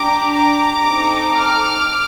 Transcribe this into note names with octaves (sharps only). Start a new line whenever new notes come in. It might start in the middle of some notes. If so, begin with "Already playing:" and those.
Already playing: D4 G4 A#5 D6
A#5 D6
C4 D#4 A4
D6 F6